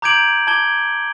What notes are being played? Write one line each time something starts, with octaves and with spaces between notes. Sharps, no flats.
A#5 D6 G6 G#6 D7 F#7
A5 D6 G#6 G7